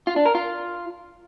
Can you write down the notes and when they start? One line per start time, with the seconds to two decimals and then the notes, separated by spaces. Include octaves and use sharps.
0.07 F4
0.16 D4
0.25 A#4
0.35 F4